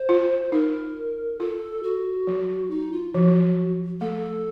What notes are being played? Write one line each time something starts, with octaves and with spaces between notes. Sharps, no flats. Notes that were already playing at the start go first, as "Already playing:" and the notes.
Already playing: C5
F4
D#4 A#4
F4 A4
F#4
F#3
D#4
F4
F3 F#4
F#3
A3 A4